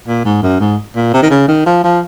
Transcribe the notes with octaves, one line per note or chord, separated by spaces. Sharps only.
A#2
G#2
F#2
G#2
A#2
C3
D#3
C#3
D#3
F3
F3